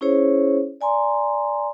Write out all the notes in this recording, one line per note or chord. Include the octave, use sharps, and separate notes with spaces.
C#4 E4 G#4 C5 C#5
D5 G#5 A#5 C6